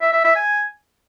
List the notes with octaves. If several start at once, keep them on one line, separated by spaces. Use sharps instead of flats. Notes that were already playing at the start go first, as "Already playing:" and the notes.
E5
E5
E5
G#5